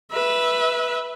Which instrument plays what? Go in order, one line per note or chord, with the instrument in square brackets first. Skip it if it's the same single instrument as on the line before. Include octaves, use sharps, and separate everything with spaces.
[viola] B4 E5